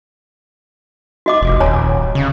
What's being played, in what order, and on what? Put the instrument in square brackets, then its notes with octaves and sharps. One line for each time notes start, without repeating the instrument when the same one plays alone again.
[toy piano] F#4 D#5 D6
[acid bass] F1
[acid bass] D#1 [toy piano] C#5 G#5 A#5
[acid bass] C#3